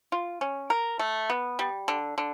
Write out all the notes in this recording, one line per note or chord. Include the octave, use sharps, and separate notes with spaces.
F4
C#4
A#4
A3
B3
G3
D3
D3